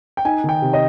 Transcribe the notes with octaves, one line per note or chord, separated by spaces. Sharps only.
G5
D#4 G#5
D#3 G5
C3
D#5